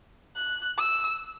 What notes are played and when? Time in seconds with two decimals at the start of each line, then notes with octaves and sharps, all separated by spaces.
0.36 F#6
0.77 E6